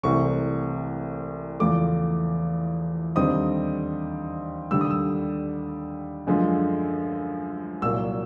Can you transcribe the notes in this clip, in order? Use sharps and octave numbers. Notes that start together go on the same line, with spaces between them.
C2 C3 E3 A3 C4 C#6
E2 C#3 F3 A3 D6
D#2 D3 G3 C4 D#4 D#6
D#2 D3 G3 E6
D#6
E6
F#2 D3 F3 G#3
C2 A#2 F#3 A#3 E6